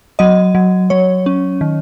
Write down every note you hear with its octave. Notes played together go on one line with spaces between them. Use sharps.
F#3 D#5
F#3
F#3 C#5
C#4
D#3